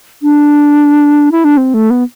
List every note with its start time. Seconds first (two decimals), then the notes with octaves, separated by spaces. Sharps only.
0.22 D4
1.32 E4
1.44 D4
1.57 C4
1.74 A3
1.90 B3